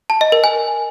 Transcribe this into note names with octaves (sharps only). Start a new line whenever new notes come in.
A5
D#5
A#4
G#5